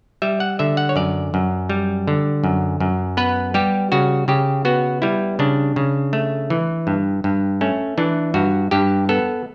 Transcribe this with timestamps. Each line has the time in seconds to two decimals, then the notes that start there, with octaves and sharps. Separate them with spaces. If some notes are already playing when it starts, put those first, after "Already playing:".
0.22 G3 E5
0.40 F#5
0.59 D3 E5
0.77 F#5
0.89 C#5
0.96 F#2 D5
1.34 F#2
1.70 G3
2.07 D3
2.44 F#2
2.80 F#2
3.17 B3 B4
3.54 G3 G4
3.92 C#3 F#4
4.28 C#3 G4
4.65 B3 F#4
5.02 G3 E4
5.39 C#3 D4
5.76 C#3
6.13 A3
6.50 E3
6.87 G2
7.24 G2
7.61 A3 C#4
7.98 E3 D4
8.34 G2 F#4
8.71 G2 G4
9.09 B3 A4